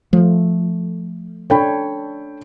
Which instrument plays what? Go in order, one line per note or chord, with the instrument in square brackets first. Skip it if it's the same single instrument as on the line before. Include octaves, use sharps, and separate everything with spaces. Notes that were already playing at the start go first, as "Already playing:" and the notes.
[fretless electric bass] F3 [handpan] A3
[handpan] D4 C#5 [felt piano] A4 G5 B5